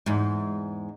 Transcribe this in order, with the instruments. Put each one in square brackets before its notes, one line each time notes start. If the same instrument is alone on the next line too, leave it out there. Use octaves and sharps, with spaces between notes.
[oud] E2 G#2